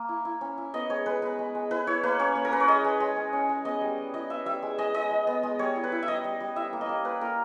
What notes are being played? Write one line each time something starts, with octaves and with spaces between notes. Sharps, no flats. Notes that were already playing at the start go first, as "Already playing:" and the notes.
Already playing: A#3
E4
E4
C#4
E4
B3 D#5
G#3 C#5
G#3 B4
B3 B4
G#3
G#3
E4 B4
E4 C#5
A#3 B4
C#4 C#5
A#3
A#4
C#4 B4
C#5
G#3 D#5
G#3
G#3
C#4
C#4
G#3
B3 D#5
G3
G3
E4 D#5
B3 E5
G3 E5
G#3
G#3 D#5
G#3 D#5
G#3
B3
G#3
G3 C#5
E4
B4
E4
E5
G3 D#5
G3
G3
E4 E5
A#3
D#5
A#3
A#3 B4
A#3 A#4